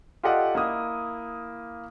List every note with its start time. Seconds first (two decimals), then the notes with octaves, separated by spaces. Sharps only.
0.23 F4 G4 A4 D5 D#5 F#5
0.55 A#3 E4 D#6